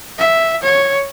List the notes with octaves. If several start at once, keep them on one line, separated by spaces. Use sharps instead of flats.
E5
C#5